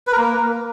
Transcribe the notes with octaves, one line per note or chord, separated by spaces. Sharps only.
B4
A#4
A#3